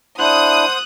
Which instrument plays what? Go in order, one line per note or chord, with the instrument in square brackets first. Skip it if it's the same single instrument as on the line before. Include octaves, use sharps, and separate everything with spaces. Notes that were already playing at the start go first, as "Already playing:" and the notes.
[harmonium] D4 E4 [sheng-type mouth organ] C5 F#5 [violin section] D#6 [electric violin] F#6